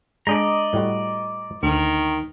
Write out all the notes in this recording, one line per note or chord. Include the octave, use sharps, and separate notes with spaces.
G#3 D4 G#4 D5 D#5 A#5
A2 G3 F#4
D2 D#3